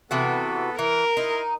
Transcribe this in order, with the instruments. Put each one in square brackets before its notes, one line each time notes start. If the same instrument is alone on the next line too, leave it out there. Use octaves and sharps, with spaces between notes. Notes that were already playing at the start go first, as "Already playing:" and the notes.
[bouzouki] C3 E3 F#4 [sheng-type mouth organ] B3 A4 B4
[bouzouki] E3 [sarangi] A#4
[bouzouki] D#4 [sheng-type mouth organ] E4 D#5 C6